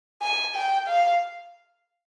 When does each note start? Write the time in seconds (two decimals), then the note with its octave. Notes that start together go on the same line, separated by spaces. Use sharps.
0.22 G#5
0.55 G5
0.87 F5